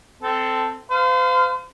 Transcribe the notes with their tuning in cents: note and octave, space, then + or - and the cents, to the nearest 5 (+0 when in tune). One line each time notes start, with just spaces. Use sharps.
C4 -15 A4 +0
C5 -40 F5 +0